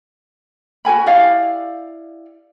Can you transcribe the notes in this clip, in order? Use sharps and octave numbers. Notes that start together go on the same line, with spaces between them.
F#4 A#4 G#5 B5
E4 G4 D5 F5